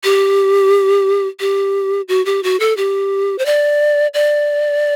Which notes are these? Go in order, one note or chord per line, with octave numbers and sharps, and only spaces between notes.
G4
G4
F#4
G4
F#4
A4
G4
C5
D5
D5